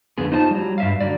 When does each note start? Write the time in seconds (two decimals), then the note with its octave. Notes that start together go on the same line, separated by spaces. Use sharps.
0.18 F2 D3 B3 G#4
0.32 D#4 F4 C5 G#5 A5
0.51 F#3 G3
0.78 G2 E5 F5
1.00 D3 F#3 G3 D5